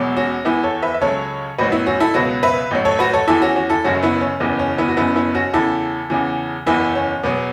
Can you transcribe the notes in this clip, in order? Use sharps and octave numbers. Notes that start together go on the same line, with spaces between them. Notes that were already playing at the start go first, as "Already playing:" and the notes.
Already playing: E1 E2 B2 F#3
C#4 F#4
E2 E3 B3 E4
A4 C#5
B4 E5
E5
C#2 C#3 F#3 A4 C#5
A1 A2 F#3 F#4 B4
B3 E4
C#4 F#4
E4 A4
C#2 B2 F#3 F#4 B4
B4 E5
A1 A2 F#3
A4 C#5
F#4 B4
A4 C#5
E2 E3 E4 A4
C#4 F#4
C#4 F#4
E4 A4
F#1 F#2 C#3 F#3 C#4 F#4
B3 E4
C#4
F#1 E2 C#3 E3 B3
C#4
B3 E4
F#4
F#1 F#2 C#3 B3 E4
B3 E4
C#4 F#4
E2 C#3 E3 E4 A4
E2 C#3 E3
F#1 E2 E3 B3 E4
C#4
E2 B2 F#3 B3